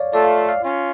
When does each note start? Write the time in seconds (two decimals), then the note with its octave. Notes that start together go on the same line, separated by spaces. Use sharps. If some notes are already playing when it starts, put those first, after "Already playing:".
Already playing: C#5 D5 F5
0.13 A3 F4 A4 D5
0.24 F5
0.38 F5
0.49 F5
0.61 C#4 F4